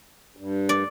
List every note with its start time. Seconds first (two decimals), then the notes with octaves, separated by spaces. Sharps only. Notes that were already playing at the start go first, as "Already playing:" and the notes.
0.37 G2
0.69 D5